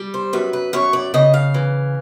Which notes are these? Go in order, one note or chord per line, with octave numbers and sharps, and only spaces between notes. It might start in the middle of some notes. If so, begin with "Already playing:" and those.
Already playing: G3
C5
F#2 B4
B4
F#2 C#5
D5
C#3 D#5
F5
E3